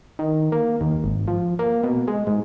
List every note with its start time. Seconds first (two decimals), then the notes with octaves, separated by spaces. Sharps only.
0.19 D#3
0.52 A#3
0.81 D#2
1.04 G#1
1.28 F3
1.59 A#3
1.84 B2
2.08 G#3
2.27 G#2